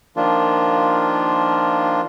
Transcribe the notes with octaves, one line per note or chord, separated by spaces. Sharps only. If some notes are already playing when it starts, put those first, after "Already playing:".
D#3 F3 A#3 D4 F4